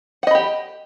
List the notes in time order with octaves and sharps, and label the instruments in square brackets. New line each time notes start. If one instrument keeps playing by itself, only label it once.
[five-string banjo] F#5
D#5
B5
G4